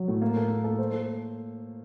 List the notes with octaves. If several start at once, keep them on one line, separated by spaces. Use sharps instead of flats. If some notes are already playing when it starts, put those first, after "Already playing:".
Already playing: F#3
A2
A#3
A4
A#3
A4
C5
A4